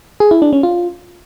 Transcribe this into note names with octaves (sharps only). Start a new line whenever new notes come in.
G#4
E4
D4
C#4
F4